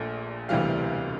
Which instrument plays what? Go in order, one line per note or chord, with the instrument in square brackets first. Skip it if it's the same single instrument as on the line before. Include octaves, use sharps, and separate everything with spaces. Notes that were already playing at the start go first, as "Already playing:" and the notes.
Already playing: [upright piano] A#1 A#2 A3
E1 D2 C3 E3 G3 F5